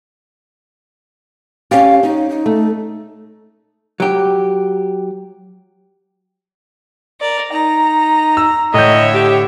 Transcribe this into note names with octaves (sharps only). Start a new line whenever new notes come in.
C#4 G4 F5
C#4 D#4
D#4
A3
F#3 G4
A#4 D5
D#4 A#5
E6
A2 D3 C#5 D#5 E5 G6
G4